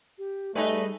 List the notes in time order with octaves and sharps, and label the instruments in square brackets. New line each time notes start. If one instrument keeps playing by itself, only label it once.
[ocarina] G4
[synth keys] G3 G#4 [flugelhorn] A3 [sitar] D#4 B4 [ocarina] D5